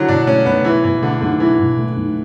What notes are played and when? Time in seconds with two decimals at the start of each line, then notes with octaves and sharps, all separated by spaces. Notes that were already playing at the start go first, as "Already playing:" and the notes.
Already playing: D3 F#3 E4
0.08 B2 D4
0.27 A3 C#4
0.46 B1 B3
0.64 E3 E4
0.84 B2 E3
1.02 D3 A3
1.21 B1 D3
1.40 E3 E4
1.59 B2
1.78 A3
1.97 B1